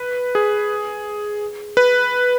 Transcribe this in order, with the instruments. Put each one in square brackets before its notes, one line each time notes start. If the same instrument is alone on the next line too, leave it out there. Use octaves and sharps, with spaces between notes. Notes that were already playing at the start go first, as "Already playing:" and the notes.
Already playing: [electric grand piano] B4
G#4
B4